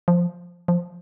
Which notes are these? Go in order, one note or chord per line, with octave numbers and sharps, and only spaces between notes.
F3
F3